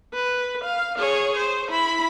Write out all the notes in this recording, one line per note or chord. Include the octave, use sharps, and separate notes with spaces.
B4
F5
G#4 C#5
C5
E4 B5